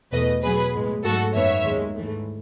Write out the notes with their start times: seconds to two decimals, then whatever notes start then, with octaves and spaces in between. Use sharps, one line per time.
0.13 E2 B2 A3 B4 D#5
0.43 B2 F#3 B3 G#4 B4
0.74 A2 G#3 B3
1.04 G#2 F#3 A3 F#4 A4
1.35 F#2 D#3 F#3 B3 C#5 E5
1.65 D#2 D#3 G#3
1.96 G#2 E3 A3